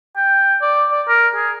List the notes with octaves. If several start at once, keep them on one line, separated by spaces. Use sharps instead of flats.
G5
D5
D5
A#4
G#4